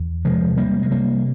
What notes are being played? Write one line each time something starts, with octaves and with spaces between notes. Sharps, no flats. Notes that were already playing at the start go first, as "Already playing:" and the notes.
Already playing: E2
C3 F3 G#3
C3 G3 A#3
G#3
C3 G3 A#3